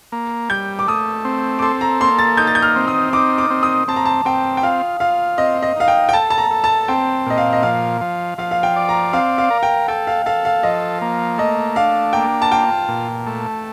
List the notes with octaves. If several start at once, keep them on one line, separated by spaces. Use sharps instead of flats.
A#3
G3 G6
D6
A3 D#6
C4
D6
A4 C6
A#5
A#3 C6
A6
D#4 G6
A6
G6
F6
C4
D#6
D#4 D6
D6
C4
D#6
C4 A5
A#5
A5
C4 G5
G5
F4 F5
F4 F5
C4 D#5
D#5
D#4 F5
G5
G5
A4 A5
A5
A#5
A4
A5
C4 G5
A#2 D#5
F5
D#5
F3 F5
F3
F3 F5
F5
G5
D5
A#5
C4 F5
F5
A#4
G5
A4 G5
F5
A4 F5
F5
F3 D#5
A#3
A3 D#5
D4 F5
A#3 G5
A5
F4 G5
A#2
A3